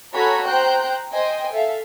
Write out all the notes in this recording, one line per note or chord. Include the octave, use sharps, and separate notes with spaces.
F#4 A4 C#5 G#5 A#5 B5
C5 G5 A#5 F#6 G6
C5 D#5 G5 G#5
A4 E5 F5